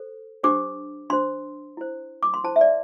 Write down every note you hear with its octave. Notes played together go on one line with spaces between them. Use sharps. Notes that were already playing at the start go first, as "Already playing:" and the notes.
Already playing: A4 C5
D4 G4 C5 D6
D4 C5 C6
E4 C5
D6
C6
E4 C5 A5
E5
D5